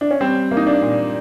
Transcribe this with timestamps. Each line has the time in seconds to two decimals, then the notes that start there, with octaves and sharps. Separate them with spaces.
0.01 D4
0.11 C#4
0.21 G3 C4
0.51 A#3
0.57 D#4
0.67 D4
0.83 A#2